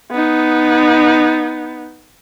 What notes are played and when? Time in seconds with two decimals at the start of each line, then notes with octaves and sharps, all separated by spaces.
0.11 B3 D#4